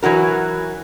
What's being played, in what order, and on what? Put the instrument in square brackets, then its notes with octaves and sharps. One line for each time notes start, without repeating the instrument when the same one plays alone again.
[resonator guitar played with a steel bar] E3 F#3 F#4 A#4